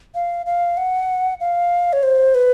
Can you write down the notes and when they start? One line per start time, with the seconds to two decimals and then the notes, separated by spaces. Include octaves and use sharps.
0.15 F5
0.46 F5
0.77 F#5
1.40 F5
1.93 C#5
2.03 C5
2.35 B4